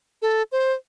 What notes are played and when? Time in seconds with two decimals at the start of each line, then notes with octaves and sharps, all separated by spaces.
0.22 A4
0.52 C5